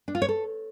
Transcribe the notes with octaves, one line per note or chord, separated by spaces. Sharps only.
D4
F4
C#5
A4